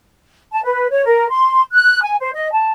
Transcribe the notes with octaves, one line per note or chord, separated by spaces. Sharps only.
A5
B4
C#5
A#4
C6
F#6
G#5
C5
D#5
A5